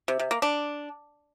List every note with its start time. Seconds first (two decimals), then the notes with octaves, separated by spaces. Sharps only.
0.08 C3
0.19 C3
0.31 A#3
0.42 D4